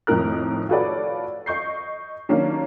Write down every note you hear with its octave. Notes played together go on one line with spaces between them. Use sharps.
F2 A2 D#3 D#4 A#4 F#6
F4 F#4 A4 B4 C#5 D5
D#5 C#6 G6 C7
D#3 F#3 A#3 C#4 D4